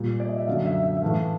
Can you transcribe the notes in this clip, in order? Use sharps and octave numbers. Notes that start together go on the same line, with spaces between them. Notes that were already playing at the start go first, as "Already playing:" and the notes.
Already playing: A#2 G3
D5
D#5
E5
F#2 D3 F#3 F5
E5
E5
E5
A2 E3 A3 F5